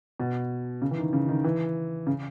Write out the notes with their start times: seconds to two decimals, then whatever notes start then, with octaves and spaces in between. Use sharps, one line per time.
0.20 B2
0.82 C#3
0.91 E3
0.98 D#3
1.13 C#3
1.29 D#3
1.44 E3
2.07 C#3